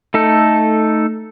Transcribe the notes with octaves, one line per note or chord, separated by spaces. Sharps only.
A3 D#4 A4